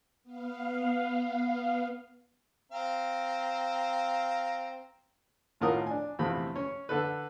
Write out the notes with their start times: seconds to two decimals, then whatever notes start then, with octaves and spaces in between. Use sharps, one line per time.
0.24 B3 F5
2.72 C4 F5 A#5
5.61 G#1 A2 F4 A#4 F#5 D#6
5.87 D4 G#5
6.19 A#1 E2 C3 A3 B5
6.56 C#4 C#5
6.89 D3 A4 B4